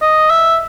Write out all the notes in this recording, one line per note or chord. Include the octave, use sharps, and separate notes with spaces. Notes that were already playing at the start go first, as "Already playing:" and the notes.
D#5
E5